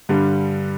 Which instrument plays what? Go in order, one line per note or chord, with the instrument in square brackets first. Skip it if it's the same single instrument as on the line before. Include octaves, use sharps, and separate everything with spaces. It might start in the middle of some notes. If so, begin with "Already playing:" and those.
[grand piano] G2 D3 G3